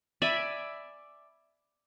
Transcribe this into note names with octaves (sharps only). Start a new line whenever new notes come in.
D5 E5 G#5 B5